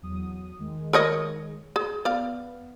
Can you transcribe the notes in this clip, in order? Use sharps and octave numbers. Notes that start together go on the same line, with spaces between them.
E2 F#3 D#6
D#3 G#3
A#4 C#5 D#5
G#4
B3 D5 F5